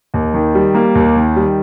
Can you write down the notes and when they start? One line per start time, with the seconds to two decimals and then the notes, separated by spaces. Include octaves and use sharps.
0.14 D#2
0.34 D#3
0.55 G3
0.74 A#3
0.95 D#2
1.16 D#3
1.36 G3